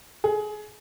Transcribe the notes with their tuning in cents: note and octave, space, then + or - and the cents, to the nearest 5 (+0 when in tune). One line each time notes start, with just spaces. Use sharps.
G#4 +25